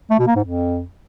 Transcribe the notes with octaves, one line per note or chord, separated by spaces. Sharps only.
A3
B2
A#3
G#2
F2